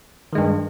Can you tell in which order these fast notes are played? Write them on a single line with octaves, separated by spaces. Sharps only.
D#3 G#3 G2